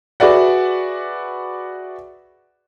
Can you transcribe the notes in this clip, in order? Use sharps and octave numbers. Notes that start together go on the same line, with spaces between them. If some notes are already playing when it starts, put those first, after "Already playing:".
F#4 G#4 B4 D5 E5 F#5